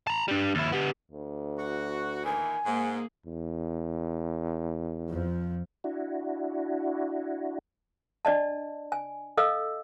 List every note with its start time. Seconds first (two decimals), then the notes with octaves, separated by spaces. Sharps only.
0.07 A5 A#5
0.28 G3 D4
0.55 D#2 E4
0.72 B3 G4
1.12 D2
1.59 F#4
2.25 A#2 D#3 E3 G#5
2.66 G#2 A#3 G#4
3.26 E2
5.09 F2 F3
5.84 D4 E4 F#4
8.25 D4 D5 D#5 A5
8.92 G#5
9.37 A4 D#5 F5 E6